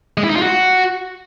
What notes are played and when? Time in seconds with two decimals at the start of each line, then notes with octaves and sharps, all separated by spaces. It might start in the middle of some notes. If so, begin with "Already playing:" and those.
0.18 G#3
0.24 E4
0.30 D#4
0.36 F4
0.42 F#4